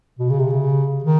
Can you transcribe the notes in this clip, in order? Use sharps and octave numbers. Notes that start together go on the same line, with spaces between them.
B2
C#3
C3
C#3
D#3